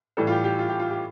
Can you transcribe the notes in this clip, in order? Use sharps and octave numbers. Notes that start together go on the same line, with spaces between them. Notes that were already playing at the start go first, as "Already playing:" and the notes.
A2 E3 G3 A4
F4
G4
G4
F4
G4
F4
G4